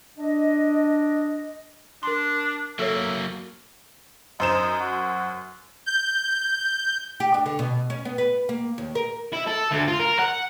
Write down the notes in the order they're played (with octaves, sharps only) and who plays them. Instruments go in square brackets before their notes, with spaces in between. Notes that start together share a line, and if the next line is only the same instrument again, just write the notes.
[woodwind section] D4 D#5
[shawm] D4 [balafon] A#4 C6
[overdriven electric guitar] F#3 A#3 [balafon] A4 C#5 [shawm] E5
[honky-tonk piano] F#2 C5 E7 [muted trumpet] D#4
[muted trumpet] F#4
[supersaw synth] G6
[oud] G4
D4
D3
B2
C#4
B3
B4
A#3
D#2
A#4
[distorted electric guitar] E4
A4
D2
F4
A#4
F#5